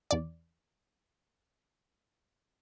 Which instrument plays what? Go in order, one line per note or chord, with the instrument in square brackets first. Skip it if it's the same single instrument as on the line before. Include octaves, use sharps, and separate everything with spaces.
[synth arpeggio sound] E2 D5